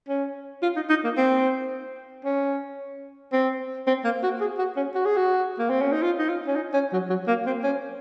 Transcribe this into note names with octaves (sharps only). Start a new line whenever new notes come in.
C#4
F4
D#4
D#4
A#3
C4
C#4
C4
C4
A#3
F#4
G#4
F#4
C#4
F#4
G#4
F#4
A#3
C4
C#4
D#4
F4
D#4
F4
C#4
D#4
C#4
F#3
F#3
A#3
C4
C#4